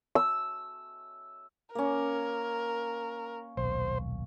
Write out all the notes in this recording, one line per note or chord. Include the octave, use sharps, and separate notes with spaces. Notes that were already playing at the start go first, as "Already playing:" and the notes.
E6
A#3 C#4 A#4
D#1 B1 C5